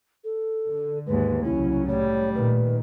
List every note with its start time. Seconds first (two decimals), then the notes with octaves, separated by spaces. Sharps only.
0.24 A4
0.68 D3
1.07 D#2 G#2 B4
1.44 C2 C#3 F#3 C#4 E4
1.88 A2 G3 C#5
2.35 A#2 D#3 B4